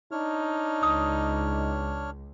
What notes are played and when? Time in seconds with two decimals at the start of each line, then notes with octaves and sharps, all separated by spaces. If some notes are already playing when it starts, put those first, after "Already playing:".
0.11 D4 D#4 C#5 F6
0.83 C#2 D#6